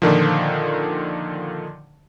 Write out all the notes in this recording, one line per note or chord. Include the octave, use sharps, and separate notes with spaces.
A#2 D3 D#3 F3